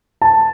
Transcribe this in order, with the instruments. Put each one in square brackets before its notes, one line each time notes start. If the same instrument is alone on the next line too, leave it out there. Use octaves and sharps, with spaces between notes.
[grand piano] A5